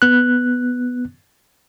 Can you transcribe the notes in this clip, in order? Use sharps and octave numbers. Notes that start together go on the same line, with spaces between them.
B3 F#6